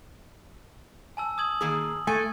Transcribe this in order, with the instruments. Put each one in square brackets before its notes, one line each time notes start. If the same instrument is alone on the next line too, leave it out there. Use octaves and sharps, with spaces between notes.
[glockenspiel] G#5 A5 E6
D#6 G#6 F#7
[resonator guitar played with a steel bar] D#3 A#3 G#4
[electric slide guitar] A3 [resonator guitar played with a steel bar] G#5 [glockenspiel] G#6